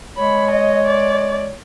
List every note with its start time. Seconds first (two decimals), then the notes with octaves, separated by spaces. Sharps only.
0.17 G#3 C#5 B5
0.51 D#5
0.87 D5